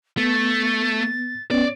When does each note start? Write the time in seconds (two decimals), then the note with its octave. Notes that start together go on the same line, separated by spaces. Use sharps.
0.18 A3 B3 A6
1.51 B3 C#4 D5